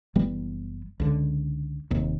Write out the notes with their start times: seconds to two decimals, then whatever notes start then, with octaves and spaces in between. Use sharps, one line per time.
0.16 F#1 E3 G3 B3
1.00 C#2 D3
1.91 D#1 D#2 C3